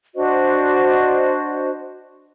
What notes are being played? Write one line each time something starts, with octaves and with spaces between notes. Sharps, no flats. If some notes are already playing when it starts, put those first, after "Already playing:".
D4 F#4 C5 D#5